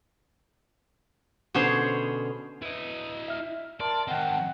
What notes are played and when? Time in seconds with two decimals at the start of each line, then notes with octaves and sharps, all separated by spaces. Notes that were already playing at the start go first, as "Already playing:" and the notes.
1.54 B2 D3 C#4 G#4 C5 C#5
2.62 E4 B4 D#5
3.28 E5 F6
3.80 A#4 D5 A5 C6
4.08 D#3 C4 D#5 F#5 G5 A5